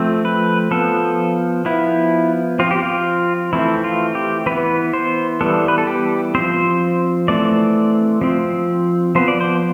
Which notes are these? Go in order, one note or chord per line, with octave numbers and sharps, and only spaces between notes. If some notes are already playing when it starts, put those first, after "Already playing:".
Already playing: F3 A3 C4
B4
F3 B3 A4
F3 B3 E4
F3 C4 F4
G4
F4
E3 A3 C4 E4
F4
G4
E3 B3 B4
C5
E3 G3 B3 A4
B4
A4
G4
F3 C4 C5
E3 A3 C4 D5
F3 C4
F3 B3 C5
D5
C5